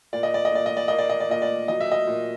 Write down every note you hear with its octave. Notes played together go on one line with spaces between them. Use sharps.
A#2 D5
D#5
D5
D#5
A#2 D5
D#5
D5
A#3 D#5
D5
D#5
D5
A#2 D#5
D5
F#3 D#5
E5
D#5
A#2